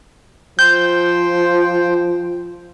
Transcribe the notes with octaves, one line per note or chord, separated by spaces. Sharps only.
F3 C5 G5 G6